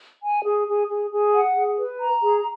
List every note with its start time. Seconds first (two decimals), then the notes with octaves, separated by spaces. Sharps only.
0.22 G#5
0.44 G#4
0.67 G#4
0.89 G#4
1.11 G#4
1.33 F#5
1.55 G#4
1.78 B4
2.00 A#5
2.22 G#4